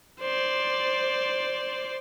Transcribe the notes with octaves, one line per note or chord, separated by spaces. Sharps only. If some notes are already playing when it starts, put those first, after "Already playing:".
C5 D5